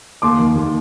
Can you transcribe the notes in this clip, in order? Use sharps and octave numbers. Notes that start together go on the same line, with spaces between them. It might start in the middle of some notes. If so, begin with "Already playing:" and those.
D#2 C6 D6
D#3
D#2